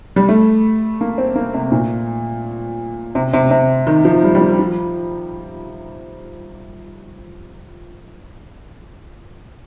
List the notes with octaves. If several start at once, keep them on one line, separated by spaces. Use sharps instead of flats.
G3
A3
A#3
C4
A#3
C3
A#2
C3
C3
C3
D#3
F3
G3
G3
F3
F3